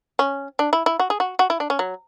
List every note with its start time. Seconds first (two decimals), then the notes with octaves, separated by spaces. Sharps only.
0.19 C#4
0.59 D4
0.73 E4
0.86 E4
0.99 F#4
1.10 G#4
1.20 F#4
1.39 F#4
1.50 E4
1.60 D4
1.70 C#4
1.79 F#3